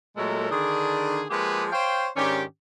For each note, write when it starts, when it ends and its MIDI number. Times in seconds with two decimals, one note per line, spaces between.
0.17 0.49 46
0.17 0.49 54
0.17 0.49 56
0.17 0.49 57
0.17 0.49 69
0.17 0.49 70
0.51 1.24 50
0.51 1.24 51
0.51 1.24 62
0.51 1.24 68
1.30 1.66 53
1.30 1.66 56
1.30 1.66 58
1.30 1.66 67
1.30 1.66 68
1.30 1.66 71
1.72 2.07 72
1.72 2.07 73
1.72 2.07 77
1.72 2.07 79
2.17 2.42 44
2.17 2.42 51
2.17 2.42 61
2.17 2.42 62
2.17 2.42 67